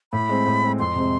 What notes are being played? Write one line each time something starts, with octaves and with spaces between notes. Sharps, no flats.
A2 B5
G#3 C4
A2
G#3 C4
F2 C6
C3 G#3 C4